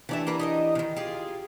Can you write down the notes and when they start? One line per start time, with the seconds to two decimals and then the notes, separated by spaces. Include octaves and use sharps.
0.09 E3 A3 D4 G4 D5 E5
0.27 A#3 A#4 B4
0.39 D#4 A#4 D#5
0.75 C3 D#3
0.96 F4 G4 G#4